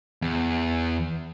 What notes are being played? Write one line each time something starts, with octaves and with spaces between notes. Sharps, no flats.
E2